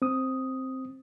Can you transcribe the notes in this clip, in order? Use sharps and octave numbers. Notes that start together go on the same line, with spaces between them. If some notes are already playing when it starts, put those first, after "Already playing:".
C4 D#6